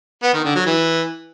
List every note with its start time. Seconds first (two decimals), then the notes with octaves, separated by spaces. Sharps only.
0.23 B3
0.33 D#3
0.44 D3
0.55 F#3
0.66 E3